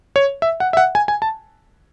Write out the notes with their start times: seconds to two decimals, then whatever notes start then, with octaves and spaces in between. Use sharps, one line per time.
0.16 C#5
0.42 E5
0.60 F#5
0.73 E5
0.77 F#5
0.95 G#5
1.08 G#5
1.22 A5